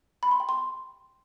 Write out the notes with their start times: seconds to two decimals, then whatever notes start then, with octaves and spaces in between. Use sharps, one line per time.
0.23 B5
0.31 C6
0.40 G5
0.49 C6